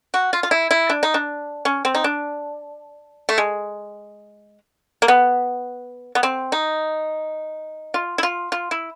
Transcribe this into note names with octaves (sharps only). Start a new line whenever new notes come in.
F#4
F4
F4
E4
E4
D4
D#4
D4
C#4
C4
D#4
D4
A3
G#3
A#3
B3
B3
C4
D#4
F4
E4
F4
F4
E4